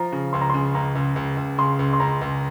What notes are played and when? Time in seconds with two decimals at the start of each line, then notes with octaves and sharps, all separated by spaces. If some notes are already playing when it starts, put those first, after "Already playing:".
Already playing: F3 A#5
0.12 C#3
0.33 C#2 C6
0.41 A#5
0.50 C#3 C6
0.75 C#2 A#5
0.95 C#2
1.16 C#2
1.37 C#2
1.58 C#3 C6
1.79 C#2
1.93 C6
2.00 C#2 A#5
2.21 C#2